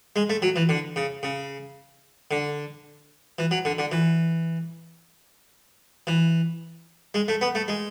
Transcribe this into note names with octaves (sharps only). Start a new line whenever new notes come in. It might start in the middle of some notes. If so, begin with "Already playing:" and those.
G#3
A3
F#3
E3
D3
C#3
C#3
D3
E3
F#3
D3
D3
E3
E3
G#3
A3
B3
A3
G#3